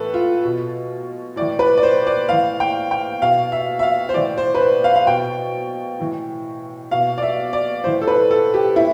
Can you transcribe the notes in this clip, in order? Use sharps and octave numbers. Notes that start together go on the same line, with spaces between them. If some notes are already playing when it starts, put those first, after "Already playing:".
Already playing: A2 E3 A4 B4
F4
B2
A2 D5
E3
B4
D5
C5
D5
A2 E3 F5
G5
G5
B2 F5
E5
E5
F5
C5
A2 E3 D5
C5
B4
C5
F5
F5
B2 G5
A2 E3
B2 F5
D5
E5
D5
A2 E3 C5
A4
B4
A4
G4
A2 E4